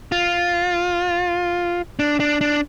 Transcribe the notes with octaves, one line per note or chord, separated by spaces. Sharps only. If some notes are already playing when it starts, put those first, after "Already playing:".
F4
D4
D4
D4